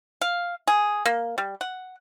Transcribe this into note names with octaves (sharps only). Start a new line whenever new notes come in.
F5
G#4
A#3
G3
F#5